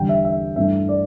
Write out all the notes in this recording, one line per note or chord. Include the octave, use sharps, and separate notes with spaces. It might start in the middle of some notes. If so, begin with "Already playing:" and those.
Already playing: E2 D3 G3 G5
E5
E5
G2 E3 A3 D4 E5
D5